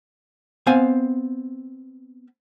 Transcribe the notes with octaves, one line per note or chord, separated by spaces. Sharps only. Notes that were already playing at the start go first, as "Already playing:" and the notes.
B3 C4 F5 G#5